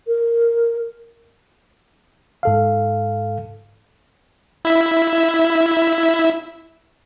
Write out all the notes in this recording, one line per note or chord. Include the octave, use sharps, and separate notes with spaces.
A#4
G#2 A4 F5
E4 E5